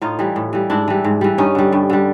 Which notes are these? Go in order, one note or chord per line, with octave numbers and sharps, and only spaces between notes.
A2 D#4 F4
E3 G3
A2
E3 G3
G#2 D4 E4
E3 G3
G#2
E3 G3
G2 C#4 D#4
D3 G3
G2
D3 G3